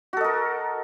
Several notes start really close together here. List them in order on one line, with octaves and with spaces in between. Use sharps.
F#4 A4 D#5 A#4